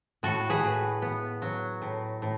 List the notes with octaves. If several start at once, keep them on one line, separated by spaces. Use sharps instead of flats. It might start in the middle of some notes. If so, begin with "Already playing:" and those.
A2 F#4 A4
G#4 B4
A2
B3
F#3
A2
A2